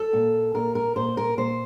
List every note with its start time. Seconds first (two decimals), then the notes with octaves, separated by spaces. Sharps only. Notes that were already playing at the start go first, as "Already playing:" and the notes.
Already playing: A4
0.13 A#2
0.55 A#2 A#4
0.75 A#4
0.96 A#2 C5
1.17 A#4
1.37 A#2 C5